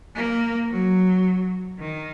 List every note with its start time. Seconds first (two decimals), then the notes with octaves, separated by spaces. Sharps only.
0.16 A#3
0.70 F#3
1.79 D#3